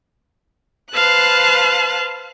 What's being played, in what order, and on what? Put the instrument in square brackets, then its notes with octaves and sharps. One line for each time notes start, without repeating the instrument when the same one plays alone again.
[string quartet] B4 C5 F5 A5 F#6